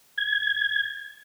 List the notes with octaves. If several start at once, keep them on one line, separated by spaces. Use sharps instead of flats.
G#6